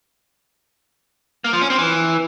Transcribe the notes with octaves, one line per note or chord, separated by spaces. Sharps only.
A#3
F3
C#4
C4
E3